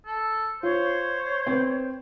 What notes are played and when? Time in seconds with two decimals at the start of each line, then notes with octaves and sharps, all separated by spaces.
0.06 A4
0.63 F4 C5 C#5
1.47 C4 B4